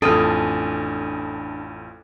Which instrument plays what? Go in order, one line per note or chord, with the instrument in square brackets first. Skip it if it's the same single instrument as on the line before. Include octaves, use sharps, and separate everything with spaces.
[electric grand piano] A1 F2 D#6 [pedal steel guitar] D4 G#5 F6 [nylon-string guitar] A4